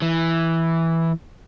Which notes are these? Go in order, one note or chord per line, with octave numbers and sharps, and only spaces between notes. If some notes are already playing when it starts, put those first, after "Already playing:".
E3